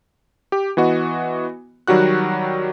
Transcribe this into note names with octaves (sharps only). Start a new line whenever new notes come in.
G4
E3 B3 F#4 D#5
D#3 F#3 G3 F#4 F#6